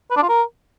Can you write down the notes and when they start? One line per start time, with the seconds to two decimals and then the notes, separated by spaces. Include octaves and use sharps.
0.11 B4
0.17 D4
0.23 F4
0.29 A#4